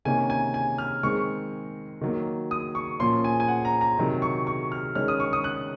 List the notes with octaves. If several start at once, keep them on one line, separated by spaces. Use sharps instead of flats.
C3 D#3 A#3 C#4 G#5
G#5
G#5
F6
D#3 G#3 C4 C#6
D#3 F#3 A#3
D#6
C#6
A#2 F3 A#3 C#4 C6
G#5
G#5
F#5
A#5
A#5
C3 D#3 F#3
C#6
C#6
F6
D#3 G#3 C#4 F6
D#6
C#6
D#6
F#6